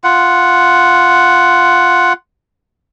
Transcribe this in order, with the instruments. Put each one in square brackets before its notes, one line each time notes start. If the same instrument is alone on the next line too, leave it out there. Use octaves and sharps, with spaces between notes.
[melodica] F4 F#5